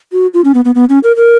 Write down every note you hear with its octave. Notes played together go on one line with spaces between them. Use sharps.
F#4
F4
C#4
B3
B3
B3
C#4
A#4
A#4